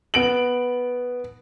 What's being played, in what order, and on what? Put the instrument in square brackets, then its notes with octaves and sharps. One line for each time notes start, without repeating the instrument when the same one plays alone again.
[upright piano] B3 D7 F#7